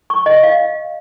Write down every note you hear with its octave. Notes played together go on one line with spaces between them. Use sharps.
C#6
D#5
F5